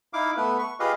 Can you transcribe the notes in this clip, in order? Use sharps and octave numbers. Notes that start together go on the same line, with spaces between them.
D#4 E4 F5 D6
A3 B3 B4
C#6
F4 G4 G#4 B4 D#5 F5